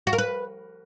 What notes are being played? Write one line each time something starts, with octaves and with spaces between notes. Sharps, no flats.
F#4
A#4
B4